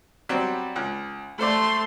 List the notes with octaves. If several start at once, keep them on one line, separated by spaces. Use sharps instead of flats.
F#3 G3 C4
C#2
A3 A4 C5 D5 C6